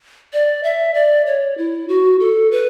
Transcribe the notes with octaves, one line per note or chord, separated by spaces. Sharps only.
D5
E5
D5
C#5
E4
F#4
A4
B4